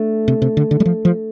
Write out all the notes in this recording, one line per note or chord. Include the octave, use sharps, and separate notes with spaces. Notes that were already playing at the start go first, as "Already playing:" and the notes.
Already playing: A3 D4
C3
C3
D3
D3
G3
F3
F3